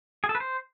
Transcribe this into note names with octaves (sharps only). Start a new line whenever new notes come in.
G#4
A4
B4
C5